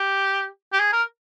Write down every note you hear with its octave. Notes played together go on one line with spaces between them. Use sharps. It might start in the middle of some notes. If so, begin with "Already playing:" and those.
Already playing: G4
G4
G#4
A#4